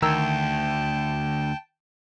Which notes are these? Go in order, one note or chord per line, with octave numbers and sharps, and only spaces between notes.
D2 D#3 G5 A5 A#5 E6